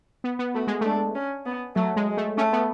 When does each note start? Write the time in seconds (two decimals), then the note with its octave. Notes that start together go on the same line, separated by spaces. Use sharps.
0.24 B3
0.39 B3
0.54 A3 F#4
0.67 G#3
0.81 A3 D4
1.15 C#4
1.46 B3
1.76 F#3 A3
1.96 G#3
2.07 G#3
2.17 A3
2.38 A3 C#4
2.53 B3